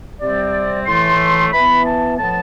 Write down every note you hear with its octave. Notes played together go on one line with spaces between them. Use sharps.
C3 G3 C4 D5
A2 E3 A3 C6
E3 B3 B5
A5
A2 F3 B3 A5